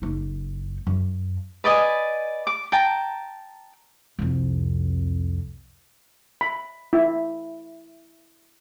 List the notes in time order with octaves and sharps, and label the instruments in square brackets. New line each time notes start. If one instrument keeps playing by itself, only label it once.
[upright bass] F#1 D#4
F#2
[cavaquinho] B4 D5 D#5 G#5
D6
G5 A5 A#5
[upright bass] C2 F2
[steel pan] B5
E4